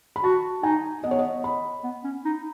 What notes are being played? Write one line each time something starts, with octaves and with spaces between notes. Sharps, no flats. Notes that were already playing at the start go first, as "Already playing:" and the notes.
B5
F#4 A5
D#4 G#5
B3 D#5
C#5
D#5
B5
B3
C#4
D#4